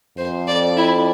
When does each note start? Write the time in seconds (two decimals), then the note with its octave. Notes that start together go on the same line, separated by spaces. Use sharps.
0.17 F2 C5
0.47 D5
0.77 E4